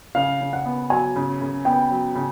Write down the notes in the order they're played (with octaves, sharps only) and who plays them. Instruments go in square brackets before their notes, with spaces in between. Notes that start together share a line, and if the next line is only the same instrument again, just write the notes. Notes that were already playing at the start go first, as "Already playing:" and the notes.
[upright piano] C#3 [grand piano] F5
[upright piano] C#3
[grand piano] F#5
[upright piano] B3
[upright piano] F#3 [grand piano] G#5
[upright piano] C#3
C#3
[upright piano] B3 [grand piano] G5
[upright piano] F#3
C#3